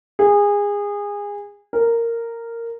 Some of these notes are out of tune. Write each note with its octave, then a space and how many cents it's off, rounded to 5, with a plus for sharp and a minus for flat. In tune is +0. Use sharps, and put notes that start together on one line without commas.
G#4 -25
A#4 -10